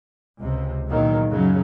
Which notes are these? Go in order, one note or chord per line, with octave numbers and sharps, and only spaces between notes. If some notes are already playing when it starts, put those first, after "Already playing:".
C#2 C3
E2 A#2 D#3 F#3
F#2 C#3 F#3